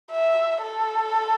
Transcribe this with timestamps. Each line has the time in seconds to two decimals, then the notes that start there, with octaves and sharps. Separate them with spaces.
0.11 E5
0.62 A4